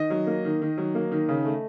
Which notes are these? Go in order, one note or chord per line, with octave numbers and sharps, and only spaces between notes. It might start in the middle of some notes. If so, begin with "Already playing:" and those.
Already playing: D#3 D#5
F#3
A#3
D#3
D#3
F#3
A#3
D#3
C#3
A3